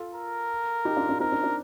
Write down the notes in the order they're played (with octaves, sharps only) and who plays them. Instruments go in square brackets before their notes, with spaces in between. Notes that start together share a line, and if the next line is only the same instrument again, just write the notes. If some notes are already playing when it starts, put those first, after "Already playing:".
Already playing: [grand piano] F4 A4
[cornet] A#4
[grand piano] D#4 G4
D4 F4
D4
[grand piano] C4 D#4 [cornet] A#4
[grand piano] D4
D4